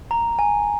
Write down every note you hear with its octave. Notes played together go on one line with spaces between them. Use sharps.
A#5
G#5